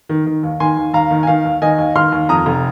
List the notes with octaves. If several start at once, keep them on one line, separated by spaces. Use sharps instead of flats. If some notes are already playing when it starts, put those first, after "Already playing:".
D#3
D#3
D#2
D#3 G#5 C6
D#2
D#2 F5 A#5
D#3
G#5
D#3 F5
D#2
D#3 D#5 G#5
D#2
D#3 C6 F6
D#2
F2 A#5 D#6
F1